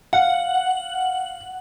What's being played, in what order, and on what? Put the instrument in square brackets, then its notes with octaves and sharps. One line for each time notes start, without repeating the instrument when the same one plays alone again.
[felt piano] F5 [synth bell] F#5